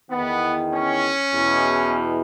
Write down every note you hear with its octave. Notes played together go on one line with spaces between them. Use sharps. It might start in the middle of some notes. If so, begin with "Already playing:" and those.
E2 D#3 B3
C#4
E2 B2